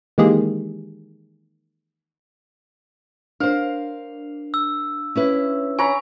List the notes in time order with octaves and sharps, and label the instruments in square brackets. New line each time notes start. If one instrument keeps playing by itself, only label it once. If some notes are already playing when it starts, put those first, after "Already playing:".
[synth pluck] D#3 E3 G#3 A#3 G4 G#4
[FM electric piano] D4 [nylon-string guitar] A#4 C5 [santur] F5
[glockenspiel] E6
[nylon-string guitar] C#4 E4 B4
[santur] C#5 A#5 B5 [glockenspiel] G#5